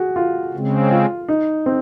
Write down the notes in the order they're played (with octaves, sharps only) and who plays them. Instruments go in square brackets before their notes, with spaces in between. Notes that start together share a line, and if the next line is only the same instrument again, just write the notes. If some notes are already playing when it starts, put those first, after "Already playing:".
Already playing: [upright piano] F#4 G#4
F4
[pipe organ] C#3 G#3 C4
[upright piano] F4
D#4
C4